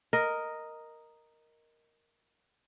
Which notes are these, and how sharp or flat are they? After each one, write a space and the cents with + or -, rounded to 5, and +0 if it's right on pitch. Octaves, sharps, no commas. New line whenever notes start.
A#4 +0 D#5 +0